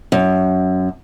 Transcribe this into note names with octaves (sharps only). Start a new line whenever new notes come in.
F#2